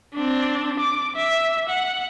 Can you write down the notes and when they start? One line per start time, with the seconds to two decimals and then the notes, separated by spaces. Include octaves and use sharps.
0.15 C4 D4
0.80 D6
1.16 E5
1.69 F#5